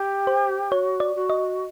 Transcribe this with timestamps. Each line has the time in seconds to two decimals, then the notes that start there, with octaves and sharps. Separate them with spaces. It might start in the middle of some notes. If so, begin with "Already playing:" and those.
Already playing: G4
0.27 C5
0.71 F#4 C#5
1.00 D5
1.15 F#4
1.30 D#5